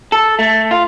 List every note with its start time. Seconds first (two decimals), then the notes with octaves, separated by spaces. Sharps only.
0.12 A4
0.39 A3
0.71 F4